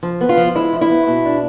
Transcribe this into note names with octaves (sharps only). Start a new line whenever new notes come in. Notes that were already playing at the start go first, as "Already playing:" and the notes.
F3
B3
F4
F3
G#3 E4
F3
E4
B3
B2
D4